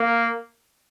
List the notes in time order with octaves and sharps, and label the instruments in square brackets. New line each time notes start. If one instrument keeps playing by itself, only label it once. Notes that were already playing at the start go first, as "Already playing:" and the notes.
Already playing: [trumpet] A#3